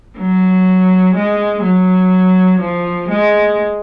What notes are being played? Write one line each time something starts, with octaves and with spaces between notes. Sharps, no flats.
F#3
G#3
F#3
F3
G#3